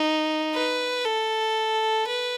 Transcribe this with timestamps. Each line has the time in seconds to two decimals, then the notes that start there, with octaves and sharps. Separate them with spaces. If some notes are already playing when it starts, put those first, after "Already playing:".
Already playing: D#4
0.55 B4
1.05 A4
2.07 B4